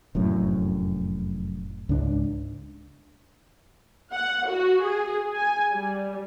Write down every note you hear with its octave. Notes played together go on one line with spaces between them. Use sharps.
F1 F#2 A2
C#2 G#2 D4
F#5
F#4
G#4
G#5
G3